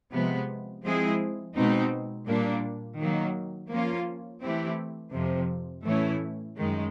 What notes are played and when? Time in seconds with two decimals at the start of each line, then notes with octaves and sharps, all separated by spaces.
0.12 C3 F3 G#3 B3
0.84 F3 G#3 C4 E4 G#4
1.56 B2 G#3 C4 D#4
2.27 A#2 G3 A#3 D4
2.99 D#3 F#3 A#3
3.70 F3 A#3 C#4 F4
4.42 E3 A3 C4 E4 G4
5.13 F2 C3 F3
5.85 A2 E3 A3 C#4 E4
6.56 F#2 D#3 G#3